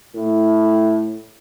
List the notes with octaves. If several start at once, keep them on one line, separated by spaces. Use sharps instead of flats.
A2